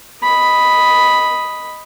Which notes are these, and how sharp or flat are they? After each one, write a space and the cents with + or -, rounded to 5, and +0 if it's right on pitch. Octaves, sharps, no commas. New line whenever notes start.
D#5 +0 B5 +0